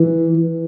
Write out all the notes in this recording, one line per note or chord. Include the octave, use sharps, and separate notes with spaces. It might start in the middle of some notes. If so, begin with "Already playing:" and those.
Already playing: E3
E3